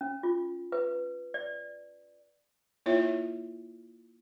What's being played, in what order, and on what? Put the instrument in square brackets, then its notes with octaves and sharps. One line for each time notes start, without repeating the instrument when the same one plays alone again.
[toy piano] C#4
F4
B4
D5
[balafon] A#3 E4 F4 C#5 E5